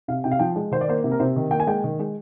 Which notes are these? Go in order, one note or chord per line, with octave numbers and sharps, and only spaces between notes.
C3 F5
C3 G5
F5
F3 G5
G#3
D#3 C5
D5
A#3 C5
C3
A#4
C3 C5
D#3
A#3 G5
G#5
G#3 G5
D#3
G#3